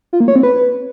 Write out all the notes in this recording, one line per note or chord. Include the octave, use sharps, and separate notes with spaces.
F4
A#3
C#5
C4
B4